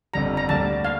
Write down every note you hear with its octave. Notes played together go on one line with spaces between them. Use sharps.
G1 F2 D3 G3 A#5
A#5
D2 D3 G3 A#3 A5
F5